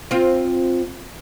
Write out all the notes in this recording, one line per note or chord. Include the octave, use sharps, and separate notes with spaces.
C4 F4